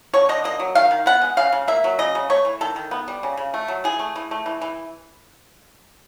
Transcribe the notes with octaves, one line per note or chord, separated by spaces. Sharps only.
D3 C#5
D3 D#5
A#3 D#5
F#3
D#3 F5
D#3
B3 F#5
G#3
C#3 F5
C#3
A#3 E5
F#3
C#3 D#5
C#3
A3 C#5
E3
D#3 A4
D#3
B3
G3
C#3
C#3
A3
F#3
E3 G#4
A3
E3
A3
E3
E3